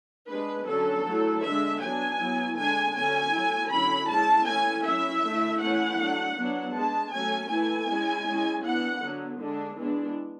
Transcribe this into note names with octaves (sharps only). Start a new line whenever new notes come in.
G#3 D4 B4
D3 F#3 C#4 A4
F#3 A3 E4
D3 G#3 D4 E5
F#3 B3 D4 G#5
F#3 B3 E4
D3 G#3 D4 G#5
D3 F#3 C#4 G#5
F#3 A3 E4
D3 F#3 C#4 E4 B5
G#3 C#4 E4 A5
E3 A3 C#4 E4 G#5
F#3 C#4 E4 E5
D3 A3 E4
E3 A3 C#4 E4 F#5
F#3 A3 D4
F#3 B3 D4
G#3 D4 A5
F#3 A3 C#4 G#5
E3 A3 E4 G#5
G#3 C#4 E4
G#3 C#4 E4
E3 B3 D4 F#5
D3 F#3 B3
D3 G#3 D4
E3 G#3 B3 D4